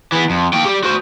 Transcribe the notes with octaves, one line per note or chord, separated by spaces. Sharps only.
E3 B3
F2
A#3 G5
G3 G4
F#4 C5